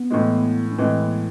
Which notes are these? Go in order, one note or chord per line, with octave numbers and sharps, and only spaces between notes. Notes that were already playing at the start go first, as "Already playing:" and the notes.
Already playing: B3
A2 E3 G#3
C#4
A2 E3 G#3 C4
B3